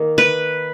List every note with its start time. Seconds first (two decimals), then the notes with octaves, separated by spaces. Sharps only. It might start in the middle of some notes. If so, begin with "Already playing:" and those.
Already playing: D#3 A#3 D#4
0.18 B4